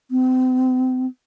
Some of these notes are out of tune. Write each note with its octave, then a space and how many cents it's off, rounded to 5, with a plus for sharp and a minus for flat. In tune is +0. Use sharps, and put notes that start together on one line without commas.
C4 -35